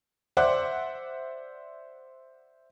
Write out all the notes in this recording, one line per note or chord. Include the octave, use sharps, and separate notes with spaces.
C5 D5 E5 F#5 D6 F#6